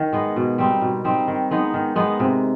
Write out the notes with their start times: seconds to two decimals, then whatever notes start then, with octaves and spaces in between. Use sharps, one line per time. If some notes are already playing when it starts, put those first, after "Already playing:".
Already playing: D#3
0.13 G#3 B3
0.36 B2
0.58 G3 C4 D#4
0.82 B2
1.04 G3 C4 D#4
1.28 D#3
1.51 G#3 B3 D#4
1.74 D#3
1.96 G#3 B3 D#4
2.20 C3